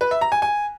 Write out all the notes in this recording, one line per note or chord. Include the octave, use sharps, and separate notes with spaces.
B4
E5
A#5
G#5
G#5